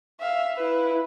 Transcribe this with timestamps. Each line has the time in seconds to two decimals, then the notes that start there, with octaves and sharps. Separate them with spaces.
0.20 E5 F5
0.56 E4 B4